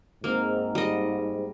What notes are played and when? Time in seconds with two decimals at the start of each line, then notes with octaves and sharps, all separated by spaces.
0.24 G#2 A#3 C4
0.75 G3 D#5